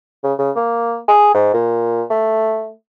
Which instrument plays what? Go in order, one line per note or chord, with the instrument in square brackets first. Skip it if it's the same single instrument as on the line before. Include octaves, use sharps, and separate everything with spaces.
[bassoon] C#3
C#3
A#3
G#4
G#2
A#2
A3